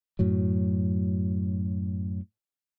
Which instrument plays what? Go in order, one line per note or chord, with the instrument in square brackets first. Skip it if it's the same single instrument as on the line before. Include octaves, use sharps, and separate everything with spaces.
[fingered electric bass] F#2 A2 F#3